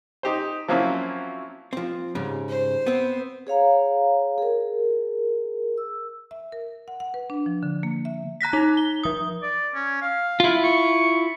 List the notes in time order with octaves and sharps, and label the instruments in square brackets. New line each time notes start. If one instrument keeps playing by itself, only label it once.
[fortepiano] D#4 G4 C5
F3 F#3 A#3 C4 C#4 E4
[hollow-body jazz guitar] F3 C4
G#2 C#3 G3
[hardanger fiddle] C5
[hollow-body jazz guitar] B3 C4
[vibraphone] G#4 C#5 F5 A#5
G#4 A#4
E6
[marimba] E5
A#4
F#5
F#5
B4
D4
F3
D3
A#3
E5
[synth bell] A#5 F#6 A#6 B6
D#4
G7
F3 D#6
[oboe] D5
C#4
F5
[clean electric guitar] E4 F4
[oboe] C#6